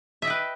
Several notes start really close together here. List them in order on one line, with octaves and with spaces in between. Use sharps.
E5 D#5 G5 B4